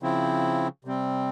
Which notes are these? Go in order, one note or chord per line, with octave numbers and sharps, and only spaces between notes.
C#3 F3 C4 E4
C3 G3 C4